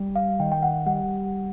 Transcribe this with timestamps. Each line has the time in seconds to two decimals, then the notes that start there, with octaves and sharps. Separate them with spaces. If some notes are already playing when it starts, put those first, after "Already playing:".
Already playing: G3
0.16 F5
0.39 D#3 G5
0.52 G5
0.63 F#5
0.86 G3 F#5